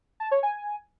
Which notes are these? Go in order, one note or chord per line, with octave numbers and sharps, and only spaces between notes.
A5
C#5
G#5